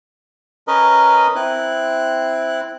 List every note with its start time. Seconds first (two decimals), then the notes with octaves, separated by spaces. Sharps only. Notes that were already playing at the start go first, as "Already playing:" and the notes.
0.68 C#4 A#4 B4 D#5
1.36 C4 E4 F#6